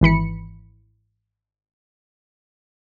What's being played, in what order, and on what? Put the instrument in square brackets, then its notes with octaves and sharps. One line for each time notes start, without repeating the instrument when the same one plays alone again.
[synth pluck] G#1 E3 B5 C#7